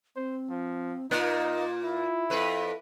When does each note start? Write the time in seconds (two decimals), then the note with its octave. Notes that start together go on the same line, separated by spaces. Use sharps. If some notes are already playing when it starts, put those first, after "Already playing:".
0.16 C4 C5
0.49 F3
1.11 A#2 A#3 D#4 F4
1.84 E4
2.30 F2 A4 B4